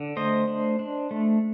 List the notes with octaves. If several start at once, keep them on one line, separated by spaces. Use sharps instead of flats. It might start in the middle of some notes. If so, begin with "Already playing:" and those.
Already playing: D3
A3 C5 D#5
D4
D4
A3